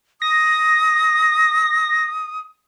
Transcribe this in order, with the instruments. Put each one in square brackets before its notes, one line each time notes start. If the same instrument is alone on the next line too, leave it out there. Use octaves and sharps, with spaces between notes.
[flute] D#6 [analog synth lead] A#6